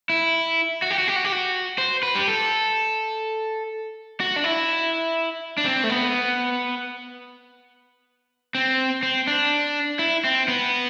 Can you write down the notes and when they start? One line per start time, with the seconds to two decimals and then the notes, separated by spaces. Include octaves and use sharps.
0.09 E4
0.82 F#4
0.90 G4
0.98 F#4
1.08 G4
1.16 F#4
1.24 G4
1.32 F#4
1.78 C5
2.03 B4
2.15 G4
2.27 A4
4.20 F#4
4.36 D4
4.44 E4
5.58 D4
5.66 C4
5.84 A3
5.89 B3
8.55 C4
9.03 C4
9.27 D4
9.99 E4
10.24 C4
10.48 B3